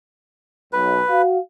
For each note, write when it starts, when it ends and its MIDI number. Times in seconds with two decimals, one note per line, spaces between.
0.73 1.00 35
0.73 1.22 71
1.09 1.37 66
1.09 1.37 77